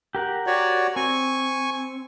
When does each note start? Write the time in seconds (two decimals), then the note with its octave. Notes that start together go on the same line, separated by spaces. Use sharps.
0.15 G4 A#4 F#5
0.47 F#4 C#5 D5
0.96 C4 G#5 C#6